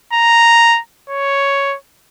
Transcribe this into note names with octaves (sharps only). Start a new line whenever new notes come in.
A#5
C#5